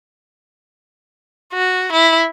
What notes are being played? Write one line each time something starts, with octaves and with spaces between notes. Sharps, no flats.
F#4
E4